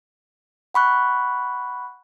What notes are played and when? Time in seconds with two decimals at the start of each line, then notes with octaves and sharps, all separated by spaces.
0.74 F#5 B5 C#6 F#6